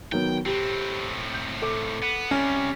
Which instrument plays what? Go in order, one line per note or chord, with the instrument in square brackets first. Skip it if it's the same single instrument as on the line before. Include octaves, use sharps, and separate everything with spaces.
[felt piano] D#3 F#3 B3 [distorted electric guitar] G5
[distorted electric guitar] A2 C4 [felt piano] G4
[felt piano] G6
A4 D6
[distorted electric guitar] B3
[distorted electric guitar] C3 G3 [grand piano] C#4